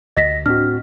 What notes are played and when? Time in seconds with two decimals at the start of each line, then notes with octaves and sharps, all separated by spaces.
0.17 D2 D#5 A#6 B6
0.46 A2 C4 D4 F#4 F6